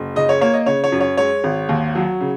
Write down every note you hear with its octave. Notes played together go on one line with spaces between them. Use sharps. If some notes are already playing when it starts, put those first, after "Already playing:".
Already playing: F#1
C#3 D#5
C#5
A#3 C#5
D#5
C#3 C#5
C#5
F#2
C#5
G#3 C#5
G#1
D#2
F#3
C#3